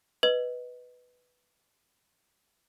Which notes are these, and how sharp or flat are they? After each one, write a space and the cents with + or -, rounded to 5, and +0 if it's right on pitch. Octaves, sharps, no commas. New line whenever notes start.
B4 +0 D#5 +0